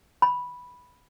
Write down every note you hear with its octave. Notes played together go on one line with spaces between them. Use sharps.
B5